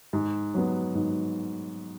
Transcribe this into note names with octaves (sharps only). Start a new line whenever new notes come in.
G#2
F#3 B3
G#2